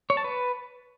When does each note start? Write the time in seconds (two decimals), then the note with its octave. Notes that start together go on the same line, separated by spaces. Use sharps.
0.10 C#5
0.17 A5
0.24 B4